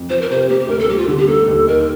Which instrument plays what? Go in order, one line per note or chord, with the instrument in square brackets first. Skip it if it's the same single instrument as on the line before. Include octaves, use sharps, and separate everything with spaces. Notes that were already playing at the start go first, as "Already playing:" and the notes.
Already playing: [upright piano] F2
[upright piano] F3 [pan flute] C5
[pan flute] A#4
[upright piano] C3 [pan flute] C5
[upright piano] A#3 [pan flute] G4
[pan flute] G4
[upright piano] D2 [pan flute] A#4
[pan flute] A4
[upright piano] G3 [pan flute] G4
[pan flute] F4
[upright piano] D3 [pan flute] G4
[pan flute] G4
[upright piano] A#3 [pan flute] A4
[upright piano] D#2
[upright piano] D#4 [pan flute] A#4